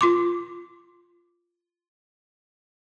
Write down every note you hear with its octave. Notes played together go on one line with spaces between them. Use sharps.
F4 C6 D6